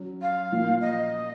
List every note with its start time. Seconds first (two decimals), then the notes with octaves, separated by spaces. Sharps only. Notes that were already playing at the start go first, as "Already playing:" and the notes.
Already playing: F#3 C#4
0.22 F5
0.52 A#2 F3 A#3
0.81 D#5